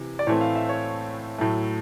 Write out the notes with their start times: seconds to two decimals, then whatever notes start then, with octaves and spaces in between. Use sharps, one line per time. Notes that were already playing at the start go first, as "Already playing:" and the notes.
Already playing: C3 E3
0.19 D5
0.27 A2 E3 A3 C4 C#5
0.41 F5
0.55 E5
0.69 C#5
1.38 A2 F#3 A3